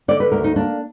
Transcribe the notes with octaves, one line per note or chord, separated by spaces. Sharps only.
D3 D5
B4
D2 A#4
D#4
A#3 D4